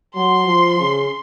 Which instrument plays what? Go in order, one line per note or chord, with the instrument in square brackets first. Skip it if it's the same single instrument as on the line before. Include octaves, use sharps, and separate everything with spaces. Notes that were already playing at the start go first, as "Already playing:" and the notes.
[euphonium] F#3 [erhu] C6
[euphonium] F3
C#3